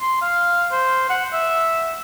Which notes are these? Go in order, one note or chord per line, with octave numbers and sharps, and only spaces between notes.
C6
F5
C5
F#5
E5